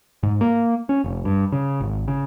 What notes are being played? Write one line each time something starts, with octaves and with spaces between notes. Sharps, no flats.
G#2
A#3
C#4
F1
G2
C#3
G#1
C#3